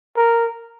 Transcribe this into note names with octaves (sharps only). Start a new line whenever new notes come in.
A#4